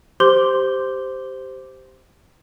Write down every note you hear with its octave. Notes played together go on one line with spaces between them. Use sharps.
G4 C5 C6 D6 G6 G7